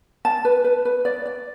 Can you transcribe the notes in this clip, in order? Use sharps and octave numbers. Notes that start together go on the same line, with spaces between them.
A5
B4
B4
B4
D5
D5